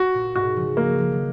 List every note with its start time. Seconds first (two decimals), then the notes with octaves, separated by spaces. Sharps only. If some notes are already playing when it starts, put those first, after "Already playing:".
Already playing: F#4
0.14 A#2
0.35 G#2 B2 F#4
0.56 C#3 F3
0.77 G#3 A#3
0.89 F#3
1.00 F3
1.11 D#3 F#3